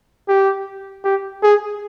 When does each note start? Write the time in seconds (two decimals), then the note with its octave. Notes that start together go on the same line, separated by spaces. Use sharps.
0.28 G4
1.04 G4
1.43 G#4